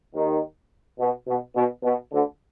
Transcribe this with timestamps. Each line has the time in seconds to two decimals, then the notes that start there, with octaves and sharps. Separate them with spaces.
0.13 D#2 D#3
0.98 B2
1.26 B2
1.55 B2
1.83 B2
2.11 D2 D3